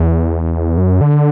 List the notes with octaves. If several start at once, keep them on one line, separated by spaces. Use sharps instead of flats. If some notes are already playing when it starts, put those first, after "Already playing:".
Already playing: E2
F#2
D3